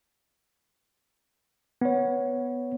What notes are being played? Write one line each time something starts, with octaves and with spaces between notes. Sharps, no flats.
B3 C#5